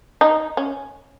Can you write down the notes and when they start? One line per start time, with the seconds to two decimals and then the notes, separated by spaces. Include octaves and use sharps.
0.21 D#4
0.57 C#4